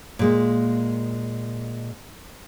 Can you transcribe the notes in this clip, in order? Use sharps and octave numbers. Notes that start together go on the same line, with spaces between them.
A#2 G#3 A#3